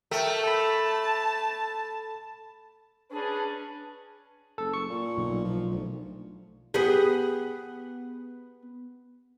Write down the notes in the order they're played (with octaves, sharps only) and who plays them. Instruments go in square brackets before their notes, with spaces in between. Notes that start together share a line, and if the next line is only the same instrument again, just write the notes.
[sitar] A3 [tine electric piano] A#4 E5 G5
[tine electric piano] A4 B5 [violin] A5
[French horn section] C#4 G#4 B4 [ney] D4
[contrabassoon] F#1 [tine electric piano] A4
[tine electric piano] C#6
[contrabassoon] A#2
[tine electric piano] B1
[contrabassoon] F3
D2
[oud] B3 G4 G#4